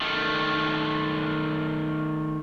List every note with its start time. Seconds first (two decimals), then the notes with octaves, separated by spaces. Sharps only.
0.02 D#3 A3